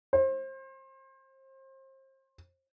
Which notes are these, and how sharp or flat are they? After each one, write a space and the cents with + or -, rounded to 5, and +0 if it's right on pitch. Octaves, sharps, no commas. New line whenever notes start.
C5 +30